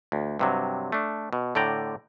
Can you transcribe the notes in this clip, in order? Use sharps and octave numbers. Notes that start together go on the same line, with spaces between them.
D2
G2 C3 F#3
A3 D4
B2
A2 D3 D5 G5 A#5